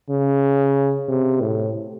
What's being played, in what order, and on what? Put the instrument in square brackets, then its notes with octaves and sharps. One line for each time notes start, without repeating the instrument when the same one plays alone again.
[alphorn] C#3
C3
A2